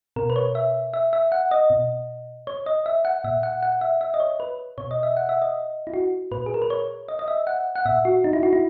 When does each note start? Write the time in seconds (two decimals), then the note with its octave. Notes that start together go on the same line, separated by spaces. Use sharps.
0.16 B2 A#4
0.30 B4
0.36 C#5
0.55 E5
0.94 E5
1.13 E5
1.32 F#5
1.51 D#5
1.70 B2
2.47 C#5
2.66 D#5
2.86 E5
3.05 F#5
3.24 A#2 E5
3.43 F#5
3.63 F#5
3.81 E5
4.01 E5
4.14 D#5
4.20 C#5
4.40 B4
4.78 B2 C#5
4.91 D#5
5.03 E5
5.17 F#5
5.29 E5
5.42 D#5
5.87 E4
5.94 F#4
6.31 A#2 B4
6.46 G#4
6.54 A#4
6.62 B4
6.70 C#5
7.08 D#5
7.19 D#5
7.28 E5
7.47 F#5
7.76 F#5
7.85 A#2 E5
8.05 F#4
8.24 D#4
8.33 E4
8.43 F#4
8.53 E4